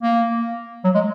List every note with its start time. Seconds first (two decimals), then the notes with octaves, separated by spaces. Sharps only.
0.03 A#3
0.84 F#3
0.95 G#3